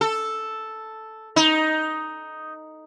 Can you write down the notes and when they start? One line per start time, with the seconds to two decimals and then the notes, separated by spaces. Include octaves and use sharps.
0.01 A4
1.36 D#4